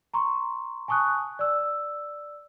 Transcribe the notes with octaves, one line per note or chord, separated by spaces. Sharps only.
A#5 C6 C#6
G#5 A5 C#6 D#6 F#6
D5 E6